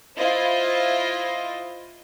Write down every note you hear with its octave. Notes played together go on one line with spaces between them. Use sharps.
E4 F4 C5 D#5